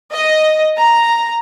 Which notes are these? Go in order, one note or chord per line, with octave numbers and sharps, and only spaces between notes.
D#5
A#5